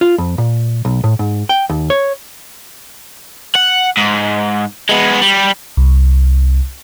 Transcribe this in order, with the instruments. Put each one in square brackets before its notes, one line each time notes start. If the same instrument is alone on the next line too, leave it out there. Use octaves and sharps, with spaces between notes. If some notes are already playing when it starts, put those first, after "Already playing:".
[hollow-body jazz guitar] F4
F2
A#2
B1
A2
G#2
G5
D#2
C#5
[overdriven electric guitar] F#5
G#2
G#3 B3
G3
[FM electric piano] C2